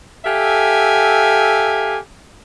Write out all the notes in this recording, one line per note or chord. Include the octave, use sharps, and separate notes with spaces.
G4 A4 E5 F5 G#5